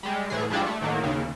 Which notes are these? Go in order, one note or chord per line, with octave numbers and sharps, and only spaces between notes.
G3 G#3
A2 E3 G#4
F3 G3 G#3 D4 E4 F4
A3
A2 D#3 F#3 A#3
D#2 C#3